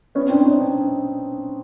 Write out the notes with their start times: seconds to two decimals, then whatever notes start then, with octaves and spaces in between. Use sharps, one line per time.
0.15 B3 C#4
0.29 C4 D4
0.43 C#4 D#4
0.57 D4